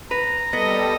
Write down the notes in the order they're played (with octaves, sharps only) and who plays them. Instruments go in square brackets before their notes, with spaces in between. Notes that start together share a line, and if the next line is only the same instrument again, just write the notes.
[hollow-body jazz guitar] B4 [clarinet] A#5
[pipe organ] G3 A4 [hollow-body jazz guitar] B3 [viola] D#5